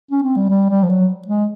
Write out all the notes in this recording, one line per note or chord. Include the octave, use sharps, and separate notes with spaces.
C#4
C4
G3
G3
G3
F3
F#3
G#3